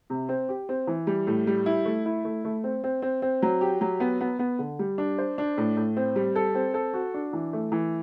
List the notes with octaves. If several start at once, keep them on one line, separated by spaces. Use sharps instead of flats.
C3
C4
G4
C4
E3
G3
A2
G3
E4
A3
E4
A3
A3
C4
C4
C4
C4
F#3
G4
F#3
B3
B3
B3
D3
G3
D4
C5
D4
A2
A2
C4
G3
A4
C4
A4
F#4
D4
E3
A3
E3